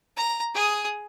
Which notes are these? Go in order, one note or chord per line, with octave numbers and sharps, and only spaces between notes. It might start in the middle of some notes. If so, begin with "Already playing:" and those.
A#5
G#4 D#6